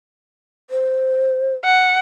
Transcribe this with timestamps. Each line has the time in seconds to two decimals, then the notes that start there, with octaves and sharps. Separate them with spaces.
0.70 C5
1.64 F#5